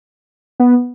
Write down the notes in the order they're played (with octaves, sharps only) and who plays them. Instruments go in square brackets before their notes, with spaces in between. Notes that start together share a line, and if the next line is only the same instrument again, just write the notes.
[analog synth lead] B3